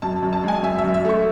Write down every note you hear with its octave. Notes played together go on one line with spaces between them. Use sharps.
F#2 A5
F#2
A5
G#3 G#5
F#2 E5
E5
F#2
E5
A3 C#6